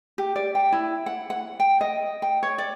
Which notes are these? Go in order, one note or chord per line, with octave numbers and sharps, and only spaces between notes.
G4
D5
G5
E4
F#5
F#5
G5
D#5
G5
C#5
D5